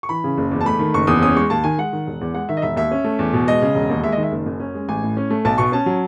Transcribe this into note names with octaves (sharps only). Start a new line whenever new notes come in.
C#6
E3 B5
C#3
F#1
E2
A5
A3 B5
D#3
F#1 C#6
E2 D#6
C#4 D#6
G#3 C#6
D#2 A5
D#3 G#5
G#3 F#5
D#3
E1
E2
G#3 F#5
D#3 E5
D#5
E1 E5
D#2 E5
C#4
A3
E2
B2
G#3 D#5
C#3
E1
D#2
G#3 E5
D#5
D#3
E5
F#1
F#2
C#4
G#3
A1 G#5
A2
C#4
A3
B1 A5
B2 C#6
C#4 A5
F#3